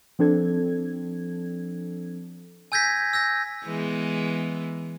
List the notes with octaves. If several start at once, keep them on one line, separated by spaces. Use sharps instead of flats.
F3 C4 D4 A4 G#6
G#5 E6 G6 G#6 A#6 B6
E6 G6 A#6
E3 G#3 B3